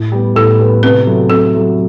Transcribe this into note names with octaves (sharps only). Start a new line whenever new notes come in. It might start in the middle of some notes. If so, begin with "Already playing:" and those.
Already playing: A2
G3 B3
A2 A4
G3 B3
C3 B4
F#3 A3 E4
C3 A4
F#3 A3 E4